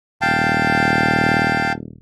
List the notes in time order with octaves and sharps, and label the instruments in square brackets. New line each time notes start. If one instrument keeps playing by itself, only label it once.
[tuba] D#1 [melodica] F5 G5 A5